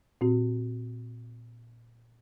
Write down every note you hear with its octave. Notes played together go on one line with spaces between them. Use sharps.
A#2 C4 F#4